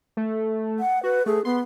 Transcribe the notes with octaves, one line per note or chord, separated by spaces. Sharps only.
A3
F#5
F#4 B4
A3 G#4
B3 C6